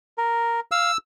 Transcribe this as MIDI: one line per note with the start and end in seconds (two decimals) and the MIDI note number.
0.18 0.60 70
0.72 0.91 77
0.72 0.97 88